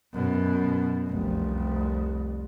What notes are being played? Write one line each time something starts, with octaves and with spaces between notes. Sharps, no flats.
F#2 B2
F1 C2